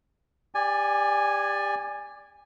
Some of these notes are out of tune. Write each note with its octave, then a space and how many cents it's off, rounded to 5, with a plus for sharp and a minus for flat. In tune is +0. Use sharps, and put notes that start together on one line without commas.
G4 +25 D5 +0 G#5 -10